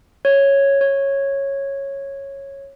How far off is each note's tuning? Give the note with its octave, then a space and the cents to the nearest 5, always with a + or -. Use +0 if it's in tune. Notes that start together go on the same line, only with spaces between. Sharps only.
C#5 -5
C#5 -10